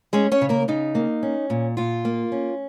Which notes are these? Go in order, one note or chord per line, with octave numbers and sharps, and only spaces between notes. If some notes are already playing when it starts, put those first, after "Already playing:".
G#3 C#4 G#4
C#4 C#5
C#3
A#3 A#4
C#3 D#4
A#3
C#4
A#2
A#2 F4
A#3
C#4